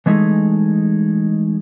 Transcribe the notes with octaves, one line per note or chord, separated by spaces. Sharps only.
E3 G#3 A3 D#4 G#4